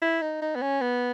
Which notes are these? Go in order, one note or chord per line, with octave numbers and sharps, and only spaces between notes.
E4
D#4
D#4
B3
C#4
B3